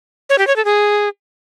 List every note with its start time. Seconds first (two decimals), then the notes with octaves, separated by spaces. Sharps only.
0.30 C#5
0.38 G4
0.47 C#5
0.56 A4
0.65 G#4